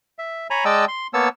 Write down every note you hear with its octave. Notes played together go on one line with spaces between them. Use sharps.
E5
C#5 G#5 A#5 B5
G#3 D5 D#5 G5 A5 E6
C6
A#3 B3 C#5 A5 E6